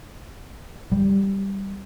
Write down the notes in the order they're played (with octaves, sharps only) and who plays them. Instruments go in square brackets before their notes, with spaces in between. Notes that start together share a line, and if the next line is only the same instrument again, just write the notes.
[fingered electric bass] G3